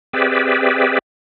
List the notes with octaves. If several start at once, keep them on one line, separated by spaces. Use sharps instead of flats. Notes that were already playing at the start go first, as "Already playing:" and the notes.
C4 G4 G#4 B4 D5 E5